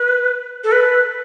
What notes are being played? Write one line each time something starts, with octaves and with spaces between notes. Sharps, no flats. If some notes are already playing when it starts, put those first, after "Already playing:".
Already playing: B4
A4
B4